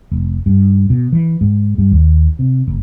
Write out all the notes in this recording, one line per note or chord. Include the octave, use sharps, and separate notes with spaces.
F1
G2
B2
E3
G#2
G2
D#2
C3
F#1